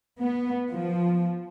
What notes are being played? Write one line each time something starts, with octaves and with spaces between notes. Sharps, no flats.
B3
F3